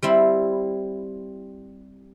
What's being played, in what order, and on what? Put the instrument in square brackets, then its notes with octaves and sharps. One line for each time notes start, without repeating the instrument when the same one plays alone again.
[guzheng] G3 C4 E4